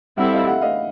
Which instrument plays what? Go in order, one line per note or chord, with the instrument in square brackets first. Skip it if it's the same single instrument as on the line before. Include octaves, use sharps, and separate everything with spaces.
[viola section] G3 C4 E4 A4 [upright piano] E5 F#5
[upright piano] D#5 F5
E5 F#5
D#5 F5